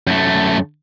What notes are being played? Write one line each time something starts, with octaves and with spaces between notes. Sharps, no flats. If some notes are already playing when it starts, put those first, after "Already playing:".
F#2 A3